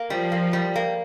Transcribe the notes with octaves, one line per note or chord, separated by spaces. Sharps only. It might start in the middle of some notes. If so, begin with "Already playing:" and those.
Already playing: A#3
F3 G3
A#3
G3
A#3